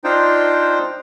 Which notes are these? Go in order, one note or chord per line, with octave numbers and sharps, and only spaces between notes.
D4 D#4 F4 C5 G5